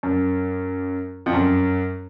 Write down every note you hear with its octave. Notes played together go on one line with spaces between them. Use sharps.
F#2
F2
F#2